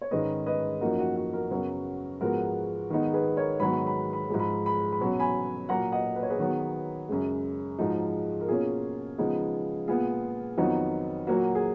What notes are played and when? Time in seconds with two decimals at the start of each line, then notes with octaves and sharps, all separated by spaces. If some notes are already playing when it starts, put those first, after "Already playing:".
0.01 C#5
0.11 G#2 D#3 G#3 C#4 B4 D#5
0.46 B4 D#5
0.81 F#2 F3 A#3 D#4 F#4 A#4
0.99 F#4
1.16 F#4
1.33 F#4 A#4
1.51 F#2 C#3 F#3 B3
2.21 G#2 F3 G#3 B3 F#4 A#4
2.90 D#3 G#3 B3 D#4
3.13 G#4 B4
3.37 A#4 C#5
3.60 G#2 D#3 F#3 B3 B5
3.87 B5
4.13 B5
4.29 G#2 F3 G#3
4.39 B5
4.66 B5
4.93 B5
5.00 B2 F#3 C#4
5.20 G#5 B5
5.69 A#2 F#3 A#3 F#5 A#5
5.92 D#5 F#5
6.16 B4
6.23 C#5
6.30 G#4 B4
6.39 D#3 F#3 B3
7.09 F#2 C#3 G#3
7.79 G#2 F3 G#3 D#4 F#4
8.41 A#4
8.48 B2 A#3 C#4 F4 G#4
9.18 C#3 F3 G#3 B3 D#4
9.88 A#2 G#3 B3 F4 G#4
10.58 F2 D#3 F#3 B3 D#4 F4
11.27 A#2 F#3 A#3 F#4
11.55 G#4